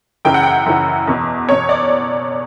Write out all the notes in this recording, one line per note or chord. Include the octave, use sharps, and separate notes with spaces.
F#2 C#3 E3 G5
F#5
G5
F#2 C#3 E3
E2 B2
E2 B2 C#5
D5